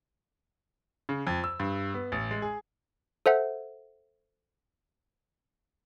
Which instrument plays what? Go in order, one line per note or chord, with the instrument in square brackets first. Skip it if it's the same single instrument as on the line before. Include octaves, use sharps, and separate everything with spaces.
[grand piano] C#3
F2
E6
G2
B3
A1
G#3
G#4
[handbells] A4 C5 E5 F#5